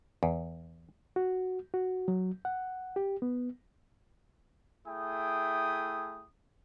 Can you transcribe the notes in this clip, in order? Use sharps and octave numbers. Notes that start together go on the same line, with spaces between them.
E2
F#4
F#4
F#3
F#5
G4
B3
A3 E4 G#4 G5 D#6